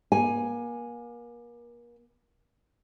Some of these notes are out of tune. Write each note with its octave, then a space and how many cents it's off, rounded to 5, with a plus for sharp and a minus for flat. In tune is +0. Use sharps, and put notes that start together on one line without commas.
A#3 +35 G#5 +0